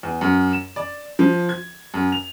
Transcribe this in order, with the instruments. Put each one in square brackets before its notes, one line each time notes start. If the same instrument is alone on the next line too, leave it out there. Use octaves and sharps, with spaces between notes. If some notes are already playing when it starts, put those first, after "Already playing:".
[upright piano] E2
F#2
E7
D5
F3
G#6
F#2
F7